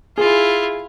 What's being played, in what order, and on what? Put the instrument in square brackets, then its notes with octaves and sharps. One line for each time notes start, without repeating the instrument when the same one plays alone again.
[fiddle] E4 F4 [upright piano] G#4